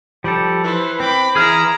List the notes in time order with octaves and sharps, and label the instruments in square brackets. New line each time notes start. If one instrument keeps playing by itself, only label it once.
[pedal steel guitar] F3 A4 [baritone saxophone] G3
[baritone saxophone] E3 [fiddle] B4 C5
[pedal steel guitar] C4 [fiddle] B5 D6
[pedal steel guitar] E3 F6 [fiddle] E4 A#5 [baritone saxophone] G#4